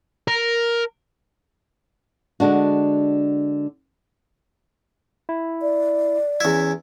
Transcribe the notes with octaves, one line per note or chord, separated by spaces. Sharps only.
A#4
D3 G#3 D4 F#4
E4
D5
E2 C#4 E4 G#6